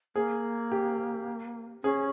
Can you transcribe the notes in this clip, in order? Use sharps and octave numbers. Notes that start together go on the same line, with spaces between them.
A#3 G#4
G4
C#4 G#4